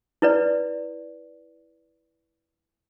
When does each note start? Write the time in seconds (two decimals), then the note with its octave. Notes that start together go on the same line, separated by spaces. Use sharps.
0.22 E4 B4 D5